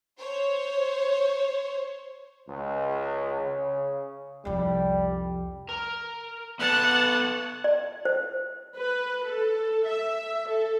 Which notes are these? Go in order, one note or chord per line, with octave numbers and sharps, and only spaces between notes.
C5 C#5
C#2
C#3
C2 F2 G3
A#4
B3 A4 B4 F#5 A5
D5
C5
B4
A4
E5
A4